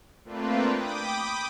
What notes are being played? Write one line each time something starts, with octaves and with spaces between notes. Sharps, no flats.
A3 A#3 C4 D4 F4 B4
G5 B5 D6 D#6